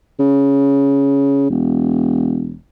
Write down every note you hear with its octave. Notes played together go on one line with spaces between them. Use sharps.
C#3
E1